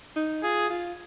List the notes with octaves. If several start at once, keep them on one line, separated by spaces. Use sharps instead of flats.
D#4
F4 G#4
F4